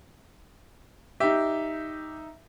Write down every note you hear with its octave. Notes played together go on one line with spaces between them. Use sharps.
D#4 G4 E5